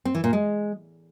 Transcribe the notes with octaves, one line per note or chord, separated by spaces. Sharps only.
C4
E3
A#2
G#3